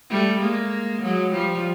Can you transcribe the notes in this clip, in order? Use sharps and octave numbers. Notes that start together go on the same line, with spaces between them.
G3 A3
G#3 A#3
F#3 G#3
F3 G3